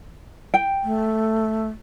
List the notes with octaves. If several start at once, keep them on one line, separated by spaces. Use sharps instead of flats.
G5
A3